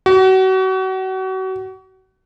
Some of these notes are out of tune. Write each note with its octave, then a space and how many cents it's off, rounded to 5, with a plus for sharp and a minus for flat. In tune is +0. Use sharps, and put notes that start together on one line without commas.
F#4 +35